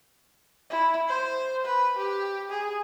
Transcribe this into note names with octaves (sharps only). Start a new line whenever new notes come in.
E4
C5
B4
G4
G#4